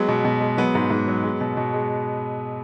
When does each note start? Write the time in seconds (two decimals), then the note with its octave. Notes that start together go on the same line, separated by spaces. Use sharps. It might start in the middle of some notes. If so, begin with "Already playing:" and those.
Already playing: F#3 G#3 B3
0.08 B2
0.25 B2
0.41 G#3
0.57 F#3 B3
0.75 G#2
0.90 G#2
1.08 F#3
1.24 G#3
1.41 B2
1.57 B2
1.74 G#3